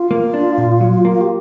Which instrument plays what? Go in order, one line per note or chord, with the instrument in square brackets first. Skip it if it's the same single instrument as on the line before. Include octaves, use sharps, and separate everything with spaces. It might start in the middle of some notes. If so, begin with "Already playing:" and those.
Already playing: [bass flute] F4
[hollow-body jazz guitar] A#3
D4
A#2
F#3
A#3
[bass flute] G4